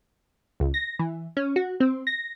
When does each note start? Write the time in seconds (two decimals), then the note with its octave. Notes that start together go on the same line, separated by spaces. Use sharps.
0.60 C#2
0.74 A#6
0.99 E3
1.37 C#4
1.56 F#4
1.80 C4
2.07 A#6